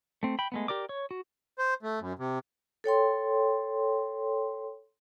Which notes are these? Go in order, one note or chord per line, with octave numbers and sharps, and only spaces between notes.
A3 C4
G5 B5
G#3 A3 B3
G4 A#4 D5 D6
C#5
F#4
C5
A3
F#2
C3
A4 C#5 G5 C6